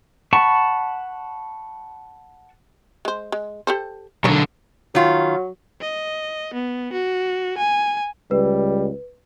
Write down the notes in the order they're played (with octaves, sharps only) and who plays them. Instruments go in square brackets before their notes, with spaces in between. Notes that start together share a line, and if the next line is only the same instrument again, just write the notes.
[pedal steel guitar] F#5 A5 B5 C#6
[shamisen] G#3 C5
G#3
G4 A4 C5
[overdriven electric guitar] B1 D3 [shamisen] A#4 C#5
[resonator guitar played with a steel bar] D#3 F4 [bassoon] F#3
[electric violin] D#5
B3
F#4
G#5
[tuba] C#2 [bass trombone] G3 [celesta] B4